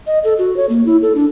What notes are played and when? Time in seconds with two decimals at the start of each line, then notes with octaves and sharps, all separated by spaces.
0.07 D#5
0.24 A4
0.38 F#4
0.57 C#5
0.69 A#3
0.86 E4
1.02 A4
1.15 D4